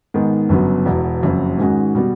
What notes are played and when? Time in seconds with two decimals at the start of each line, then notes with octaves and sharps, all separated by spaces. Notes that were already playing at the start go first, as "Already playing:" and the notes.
0.14 G#2 D#3 G#3 B3
0.49 G1 F#2 C#3 F#3 B3
0.86 E1 E2 B2
1.23 F#1 F2 C#3 F#3
1.58 G#2 D#3 G#3 C#4 F#4
1.95 B2 G3 B3